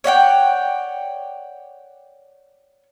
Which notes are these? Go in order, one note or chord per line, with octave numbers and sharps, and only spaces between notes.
C#5 D5 F#5 G5